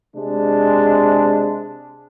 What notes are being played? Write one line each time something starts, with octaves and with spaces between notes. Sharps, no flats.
C3 G#3 D4